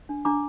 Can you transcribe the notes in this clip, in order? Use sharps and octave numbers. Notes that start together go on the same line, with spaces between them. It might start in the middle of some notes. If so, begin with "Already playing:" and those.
D4
D4 A#5 D6